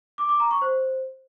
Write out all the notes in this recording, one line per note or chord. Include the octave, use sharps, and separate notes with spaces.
D6
D6
A#5
C#6
C5